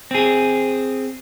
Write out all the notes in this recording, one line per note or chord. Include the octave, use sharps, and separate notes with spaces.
C4 G#4